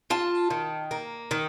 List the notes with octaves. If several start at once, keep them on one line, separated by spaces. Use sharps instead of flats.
F4 A5
D#3
A#3
D#3